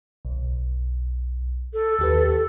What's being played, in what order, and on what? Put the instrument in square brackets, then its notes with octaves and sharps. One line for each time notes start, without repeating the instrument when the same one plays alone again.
[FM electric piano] B1
[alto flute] A4
[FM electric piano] D#2 G4 B4